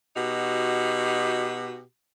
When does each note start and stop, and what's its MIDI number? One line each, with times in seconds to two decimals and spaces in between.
0.16 1.82 47
0.16 1.82 63
0.16 1.82 66
0.16 1.82 67